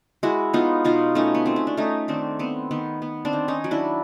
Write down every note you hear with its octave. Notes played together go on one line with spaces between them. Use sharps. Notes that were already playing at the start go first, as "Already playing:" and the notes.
G#3 E4 F#4
B3 D#4 F4
B2 D#4 F4
A3 C#4 D#4
B3
A3 C4
C#4
D4
A3 C#4 D#4
D#3 C4 D4
B3 C4
D#3 B3
B3
C4 D4
D#3
C#4 D#4
F#3
D4 E4